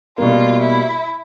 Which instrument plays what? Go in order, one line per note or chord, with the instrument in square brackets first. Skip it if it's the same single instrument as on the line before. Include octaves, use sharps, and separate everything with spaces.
[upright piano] B2 G3 A#3 [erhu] F4
[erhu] E4